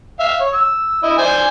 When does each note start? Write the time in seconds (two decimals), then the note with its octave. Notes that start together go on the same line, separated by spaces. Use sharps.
0.20 E5 F5
0.41 C#5
0.54 E6
1.03 E4 D#5
1.18 C5 D5 G#5